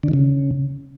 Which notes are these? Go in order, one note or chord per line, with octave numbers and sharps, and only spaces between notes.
D3
D#3
C#3